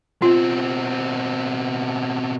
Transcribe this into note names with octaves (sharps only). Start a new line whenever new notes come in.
B2 C4 F4